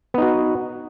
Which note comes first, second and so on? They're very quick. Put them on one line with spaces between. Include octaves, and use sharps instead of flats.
B3 D#4 F#4